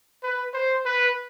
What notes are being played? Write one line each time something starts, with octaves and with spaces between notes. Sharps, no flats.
B4
C5
B4